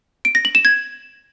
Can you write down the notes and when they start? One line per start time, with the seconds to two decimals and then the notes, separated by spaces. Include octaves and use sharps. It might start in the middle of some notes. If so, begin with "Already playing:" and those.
0.25 D7
0.35 A#6
0.45 F#7
0.55 E7
0.65 G#6